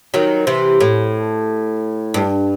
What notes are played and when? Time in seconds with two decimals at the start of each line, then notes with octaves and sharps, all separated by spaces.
0.14 D#3 F#3
0.47 C3 E3
0.81 A2
2.14 G2